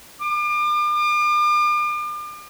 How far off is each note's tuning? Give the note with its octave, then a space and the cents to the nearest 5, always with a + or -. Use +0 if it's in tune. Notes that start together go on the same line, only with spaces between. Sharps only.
D6 +40